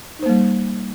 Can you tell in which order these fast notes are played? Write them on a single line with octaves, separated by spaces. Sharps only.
D#4 C5 A#3 G3